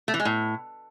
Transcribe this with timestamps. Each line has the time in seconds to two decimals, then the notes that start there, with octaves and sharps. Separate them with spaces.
0.08 A3
0.14 E3
0.20 G#3
0.25 A2